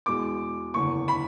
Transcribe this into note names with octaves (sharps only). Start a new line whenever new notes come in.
E2 B2 G#3 D6
F#1 E2 D3 C#6
B5